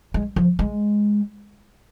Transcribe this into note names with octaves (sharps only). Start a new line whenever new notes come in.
G#3
F3
G#3